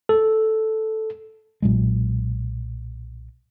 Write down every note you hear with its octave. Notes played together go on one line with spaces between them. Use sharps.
A4
B1 A#2 F#3 G#3